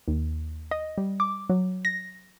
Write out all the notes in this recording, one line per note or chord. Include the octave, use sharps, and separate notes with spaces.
D#2
D#5
G3
D6
F#3
A#6